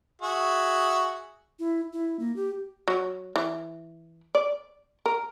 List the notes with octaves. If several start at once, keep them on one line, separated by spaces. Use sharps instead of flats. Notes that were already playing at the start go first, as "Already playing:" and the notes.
F#4 G#4 E5
E4
E4
A#3
G4
F#3
E3
D5
A#4